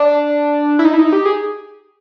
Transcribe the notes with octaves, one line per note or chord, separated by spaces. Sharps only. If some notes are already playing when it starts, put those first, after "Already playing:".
Already playing: D4
E4
D#4
E4
D#4
G4
G#4